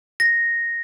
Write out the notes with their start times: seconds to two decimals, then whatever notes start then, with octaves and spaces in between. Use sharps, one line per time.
0.20 A#6